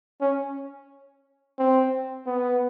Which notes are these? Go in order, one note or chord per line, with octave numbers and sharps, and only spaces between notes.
C#4
C4
B3